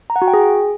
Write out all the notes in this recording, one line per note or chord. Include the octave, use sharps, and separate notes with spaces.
A#5
F#5
F#4
G5
G#4